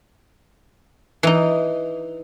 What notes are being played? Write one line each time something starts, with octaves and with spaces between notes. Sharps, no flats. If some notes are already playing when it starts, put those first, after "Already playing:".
E3 D#4